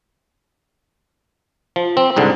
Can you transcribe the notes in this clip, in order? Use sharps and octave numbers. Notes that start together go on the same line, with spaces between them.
F3
C4
C2 G#2 D3